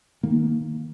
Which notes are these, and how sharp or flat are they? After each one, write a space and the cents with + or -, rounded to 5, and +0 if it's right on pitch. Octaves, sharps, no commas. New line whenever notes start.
D#3 +0 A#3 +0